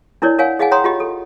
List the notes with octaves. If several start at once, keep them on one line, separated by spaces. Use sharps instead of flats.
D4 E4 A#4 C#5 D5
A#4 C#5 F5 F#5 G#5
G#4 D#5 F5 F#5 G#5
C#5 F#5 G5 A#5 C6 D#6
F4 G4 D#5
A4